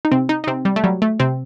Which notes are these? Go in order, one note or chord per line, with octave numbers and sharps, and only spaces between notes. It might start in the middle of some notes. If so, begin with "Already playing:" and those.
D#4
C3 C4
D#4
D#4
C3 C4
G3
A3
F#3 G3
A3
C3 C4